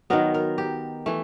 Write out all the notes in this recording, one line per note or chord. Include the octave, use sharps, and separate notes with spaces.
D#3 F#3 B3 A#4
A#4
G4
E3 A3